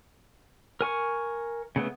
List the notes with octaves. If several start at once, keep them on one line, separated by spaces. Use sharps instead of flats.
A#4 G#5 C#6
C#3 A3 B3